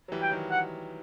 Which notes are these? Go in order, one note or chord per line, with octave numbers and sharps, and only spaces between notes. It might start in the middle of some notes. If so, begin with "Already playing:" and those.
F#3
E3 G3
G5
D#3 F#3
F#5